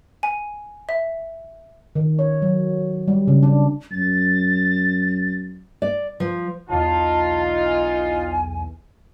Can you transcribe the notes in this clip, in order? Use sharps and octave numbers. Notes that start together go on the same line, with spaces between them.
G#5
E5
D#3
C#5
F#3
G3
C#3
D4
F#2 A6
D5
F3
B1 E2 D#4 F4 A5
G#5